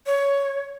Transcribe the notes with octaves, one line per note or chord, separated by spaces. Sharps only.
C#5